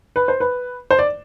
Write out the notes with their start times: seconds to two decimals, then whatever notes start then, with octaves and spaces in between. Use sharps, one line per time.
0.16 B4
0.28 C5
0.40 B4
0.91 C5
0.99 D5